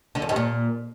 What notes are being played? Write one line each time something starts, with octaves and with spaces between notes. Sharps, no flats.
D3
F#2
G2
A#2